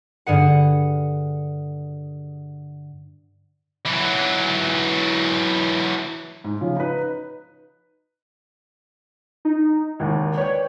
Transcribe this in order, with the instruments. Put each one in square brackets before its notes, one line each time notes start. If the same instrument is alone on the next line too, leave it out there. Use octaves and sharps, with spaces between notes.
[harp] G2 D3 G#4 F#5
[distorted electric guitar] E3 F#3
[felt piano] G#2
C#3 F3
D#4 B4
[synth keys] D#4
[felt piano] G#1 D#2
[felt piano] B4 D5 G5 [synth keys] C#5